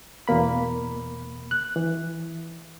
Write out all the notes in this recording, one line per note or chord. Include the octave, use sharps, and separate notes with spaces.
E2 B2 A#3 B5
F#6
E3